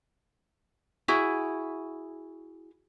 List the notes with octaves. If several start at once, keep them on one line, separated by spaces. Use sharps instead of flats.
E4 F#4 G#4